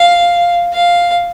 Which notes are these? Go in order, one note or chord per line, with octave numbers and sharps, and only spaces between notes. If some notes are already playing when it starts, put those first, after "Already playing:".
Already playing: F5
F5